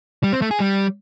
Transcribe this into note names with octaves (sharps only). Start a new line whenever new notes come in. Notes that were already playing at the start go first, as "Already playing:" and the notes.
G3
C4
A3
G#4
G3